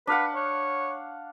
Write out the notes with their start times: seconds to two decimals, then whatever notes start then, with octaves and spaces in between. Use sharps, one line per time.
0.07 D4 B4 F5 F#5
0.35 C#5